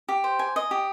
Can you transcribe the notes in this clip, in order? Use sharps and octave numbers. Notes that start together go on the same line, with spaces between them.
G4
C5
G#5
D#5
G4